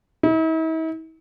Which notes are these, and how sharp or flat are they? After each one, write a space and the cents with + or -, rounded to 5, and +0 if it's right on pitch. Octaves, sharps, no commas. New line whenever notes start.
E4 -45